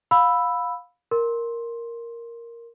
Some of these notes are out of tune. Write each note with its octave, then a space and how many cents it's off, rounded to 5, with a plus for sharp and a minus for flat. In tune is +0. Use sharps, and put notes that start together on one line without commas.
F5 +25 B5 +0 E6 +0
A#4 +0 C6 +10